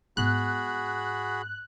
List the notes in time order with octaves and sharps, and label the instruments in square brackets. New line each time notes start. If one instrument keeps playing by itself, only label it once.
[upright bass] G#2 B3 [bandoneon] F#4 G#4 B5 [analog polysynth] F#6